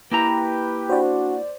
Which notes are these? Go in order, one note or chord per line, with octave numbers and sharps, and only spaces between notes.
A#3 E4 G4 B4 G5 A#5
D4 F#4 C5 D5